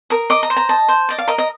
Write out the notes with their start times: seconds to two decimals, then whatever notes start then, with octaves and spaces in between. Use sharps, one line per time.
0.10 A#4 D#6
0.30 D#5 D6
0.43 A#5
0.50 C5
0.56 A#5
0.69 D#5 A5
0.88 C5
1.09 D5 D#5
1.18 F5
1.28 A#4 D#5
1.38 D#5